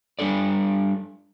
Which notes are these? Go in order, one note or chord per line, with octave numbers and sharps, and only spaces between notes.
G3 D4 A4 D5